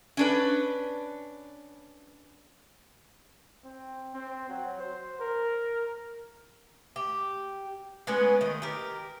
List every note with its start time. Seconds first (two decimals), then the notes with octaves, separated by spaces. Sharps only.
0.17 C#4 D4 B4
3.64 C4
4.14 C4
4.49 F#3
4.80 C5
5.20 A#4
6.96 G4
8.07 G#3 B3 C#4 B4
8.41 D#3 D#5
8.62 G4 A#4